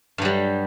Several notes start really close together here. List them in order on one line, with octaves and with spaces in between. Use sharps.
G2 F#3 G3